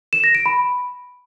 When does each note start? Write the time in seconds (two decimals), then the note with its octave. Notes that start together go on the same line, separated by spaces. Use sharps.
0.13 E7
0.24 A#6
0.35 D7
0.46 B5